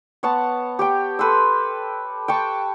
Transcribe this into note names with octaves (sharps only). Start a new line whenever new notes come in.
B3 C#5 F#5 A5
G4 C#5 G5
A4 B4 C6 E6
G5 A5 C#6